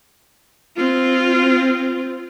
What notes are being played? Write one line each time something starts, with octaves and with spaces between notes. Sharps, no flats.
C4 F4